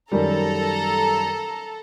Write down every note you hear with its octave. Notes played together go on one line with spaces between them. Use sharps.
F#2 D#3 G3 A4 A#5